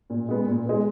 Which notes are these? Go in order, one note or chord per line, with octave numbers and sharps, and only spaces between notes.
A#2
G#3 B3
A#2
G#3 B3